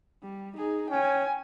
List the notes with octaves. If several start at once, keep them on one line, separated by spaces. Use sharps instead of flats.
G3
D#4 G#4
C#4 G5 G#5